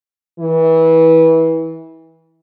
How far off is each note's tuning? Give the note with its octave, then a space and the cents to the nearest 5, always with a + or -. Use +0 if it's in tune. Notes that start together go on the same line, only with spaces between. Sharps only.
E3 -25